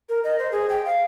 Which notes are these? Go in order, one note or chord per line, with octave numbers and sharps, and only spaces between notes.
A#4
D#5
C5
G#4
G5
F5